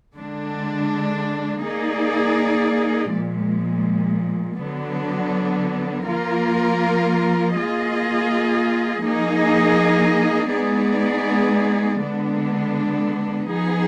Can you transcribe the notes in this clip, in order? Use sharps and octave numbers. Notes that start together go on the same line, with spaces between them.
D3 G#3 D4
A#3 D#4 G#4 D5
A#2 F3 G#3
D3 F#3 B3 D4
F3 A#3 F4 A#4
A#3 F4 G#4 D#5
F3 A#3 D#4 G#4 D#5
G#3 B3 D#4 G#4 D5
D3 G#3 B3 D4
F3 B3 D#4 G#4